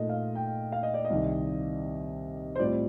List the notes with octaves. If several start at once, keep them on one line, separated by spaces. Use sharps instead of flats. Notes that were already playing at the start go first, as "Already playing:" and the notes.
Already playing: A#2 A3 D#4 D#5
F5
G5
F5
D#5
D5
D#5
C2 C3 D#3
C5
A2 G3 C4 F4 D5